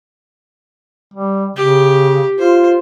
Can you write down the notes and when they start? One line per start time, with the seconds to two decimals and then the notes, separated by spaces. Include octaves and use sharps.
1.14 G3
1.56 C#3 G4
2.39 F4 C5